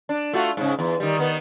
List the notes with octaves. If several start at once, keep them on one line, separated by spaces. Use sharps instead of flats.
D4
A3 F4 F#4
G#2 C#3
E2
D#3 G3
D#3 B3